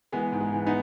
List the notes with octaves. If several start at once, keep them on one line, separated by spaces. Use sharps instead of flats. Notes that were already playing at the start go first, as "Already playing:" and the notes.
E3 G#3 B3
G#2
G#3
E3
B3 D#4